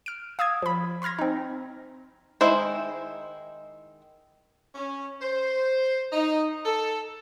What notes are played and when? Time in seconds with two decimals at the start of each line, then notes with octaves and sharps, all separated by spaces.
0.06 F6 D7
0.39 F5 D#6 E6 G#6
0.62 F3 B5
1.02 B5 C6 F6 G#6 A#6
1.19 C4 D#4
2.41 D#3 G#3 E4 C5
4.75 C#4
5.20 C5
6.12 D#4
6.66 A4